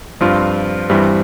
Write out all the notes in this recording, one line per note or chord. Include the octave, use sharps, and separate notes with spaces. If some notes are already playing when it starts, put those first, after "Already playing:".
G2 F3 C4 F4
G2 E3 G3 C4